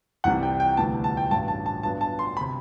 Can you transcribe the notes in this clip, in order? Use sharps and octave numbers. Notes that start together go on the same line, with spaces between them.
C2 C3 E3 G3 F#5
G5
G5
D2 C3 E3 G3 B3 A5
A5
G5
A1 G2 F#3 A5
A5
A5
G2 F#3 B3 D4 A5
A5
C6
B5
C3